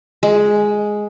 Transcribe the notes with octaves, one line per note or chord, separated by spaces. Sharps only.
G#3